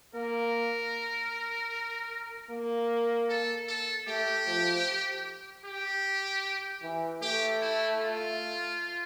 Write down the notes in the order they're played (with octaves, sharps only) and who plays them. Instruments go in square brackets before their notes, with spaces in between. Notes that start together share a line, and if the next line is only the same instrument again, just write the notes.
[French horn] A#3 [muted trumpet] A#4
[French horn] A#3
[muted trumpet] A4
A4
[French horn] A3 [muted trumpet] G4
[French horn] F3
[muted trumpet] G4
[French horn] E3
[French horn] A3 [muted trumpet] G4
[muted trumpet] E4
F4